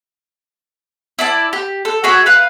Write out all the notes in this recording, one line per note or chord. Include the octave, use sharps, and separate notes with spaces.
E4 D5 A5
G4
A4
F#4 G#4 E5
B4 F5